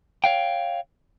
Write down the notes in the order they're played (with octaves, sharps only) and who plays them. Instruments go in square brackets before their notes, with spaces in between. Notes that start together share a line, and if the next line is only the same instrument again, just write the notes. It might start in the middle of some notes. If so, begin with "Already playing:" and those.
[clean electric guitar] C#5 F5 G5